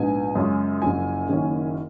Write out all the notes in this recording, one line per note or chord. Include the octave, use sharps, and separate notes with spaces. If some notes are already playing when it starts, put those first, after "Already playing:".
Already playing: A#1 G#2 F3 B3 D#4 G#5
F#2 C#3 G#3 C#4 F4
F#1 F#2 F3 G#5
F#1 F#2 D#3 A#3 C#4